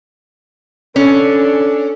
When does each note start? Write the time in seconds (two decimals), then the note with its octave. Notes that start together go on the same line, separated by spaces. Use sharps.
0.96 C#4 D4 A4